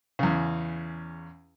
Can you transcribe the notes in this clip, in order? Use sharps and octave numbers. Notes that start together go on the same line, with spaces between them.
E2 C#3